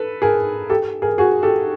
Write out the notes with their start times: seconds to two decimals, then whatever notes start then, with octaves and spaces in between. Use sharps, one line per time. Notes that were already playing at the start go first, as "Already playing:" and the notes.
Already playing: A4 B4
0.22 G#4 A#4
0.70 G4 A4
1.02 G#4 A#4
1.18 F#4 G#4
1.43 G4 A4